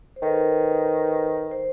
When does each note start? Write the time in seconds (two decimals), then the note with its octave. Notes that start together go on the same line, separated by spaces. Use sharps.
0.16 C5
0.22 D#3 A4 B4
1.51 C5